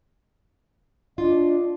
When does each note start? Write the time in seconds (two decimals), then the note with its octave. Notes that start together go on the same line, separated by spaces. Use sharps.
1.18 D4 F4 D#5